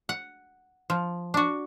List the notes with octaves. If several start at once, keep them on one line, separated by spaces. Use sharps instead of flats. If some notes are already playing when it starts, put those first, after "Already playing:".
F#5
F3
D4 F#4